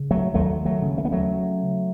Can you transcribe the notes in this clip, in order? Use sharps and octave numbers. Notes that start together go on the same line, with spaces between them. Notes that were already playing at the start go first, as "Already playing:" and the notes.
Already playing: C#3
F#3 A3
D#2 F#3 A3
F#3 A3
C#3
A3
B3
F#3 A3